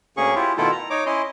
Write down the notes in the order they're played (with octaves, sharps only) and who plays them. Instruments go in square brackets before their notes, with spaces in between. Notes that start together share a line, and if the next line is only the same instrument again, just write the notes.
[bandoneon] D2 A#3 C#4 G#4 C#6
E4 F4 G4
B2 D#3 A3 E4 F4 A4
A#5
D#4 C#5 D6
C#4 E4 D#5 C6